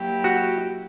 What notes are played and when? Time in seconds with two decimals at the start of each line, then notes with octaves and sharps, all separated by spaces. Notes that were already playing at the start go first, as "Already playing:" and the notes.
Already playing: F#3 A#3 E4 G4
0.24 F#4